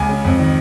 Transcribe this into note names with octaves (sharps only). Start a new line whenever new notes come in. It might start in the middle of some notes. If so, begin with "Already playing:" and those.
Already playing: C#2 G#5
C#3
F2
D#3